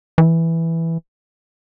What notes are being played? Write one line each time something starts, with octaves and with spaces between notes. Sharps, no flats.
E3